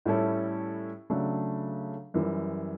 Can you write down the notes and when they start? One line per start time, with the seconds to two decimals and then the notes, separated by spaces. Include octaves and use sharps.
0.06 A2 G3 C#4 E4 A4
1.10 C#3 F#3 A3 D4
2.14 F#2 E3 G3